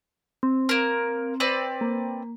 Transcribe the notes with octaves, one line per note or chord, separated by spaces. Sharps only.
C4
A#3 A#4
C4 B4 D5
A#3